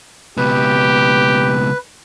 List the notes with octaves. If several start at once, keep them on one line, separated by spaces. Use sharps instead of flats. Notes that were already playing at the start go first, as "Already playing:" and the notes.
C#2 B2 G4 B4